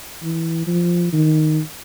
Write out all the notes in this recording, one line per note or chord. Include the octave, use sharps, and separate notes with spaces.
E3
F3
D#3